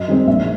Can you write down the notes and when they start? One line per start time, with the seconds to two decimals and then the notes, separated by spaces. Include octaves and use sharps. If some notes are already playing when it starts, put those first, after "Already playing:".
Already playing: F#2 D#5
0.08 D#3 G#3 C4
0.27 A#1 E5